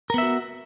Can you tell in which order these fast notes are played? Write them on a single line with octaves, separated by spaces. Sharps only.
A#4 B3 E5 F#4